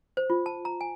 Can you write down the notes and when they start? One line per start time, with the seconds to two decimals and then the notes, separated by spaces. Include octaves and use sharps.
0.17 C5
0.30 F4
0.46 A5
0.65 A#5
0.81 G#5